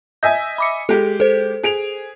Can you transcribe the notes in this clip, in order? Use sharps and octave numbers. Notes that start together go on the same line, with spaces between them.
D#5 E5 G#5 G6
B5 D6 C#7
G#3 G4 A4
A4 C5
G#4 D7 F7